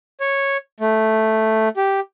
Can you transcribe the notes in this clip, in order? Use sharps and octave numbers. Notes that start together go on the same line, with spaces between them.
C#5
A3
G4